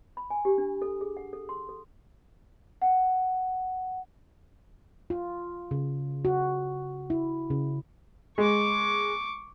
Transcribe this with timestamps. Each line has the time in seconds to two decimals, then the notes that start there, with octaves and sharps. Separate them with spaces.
0.17 B5
0.30 G#5
0.45 G4
0.58 D4
0.82 A4
1.01 G#4
1.17 F#5
1.33 A4
1.49 C6
1.69 A4
2.82 F#5
5.10 F4
5.71 C#3
6.25 F#4
7.10 E4
7.50 C#3
8.38 G#3 C#6 D6